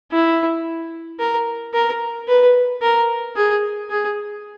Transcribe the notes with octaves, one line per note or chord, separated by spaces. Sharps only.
E4
A#4
A#4
B4
A#4
G#4
G#4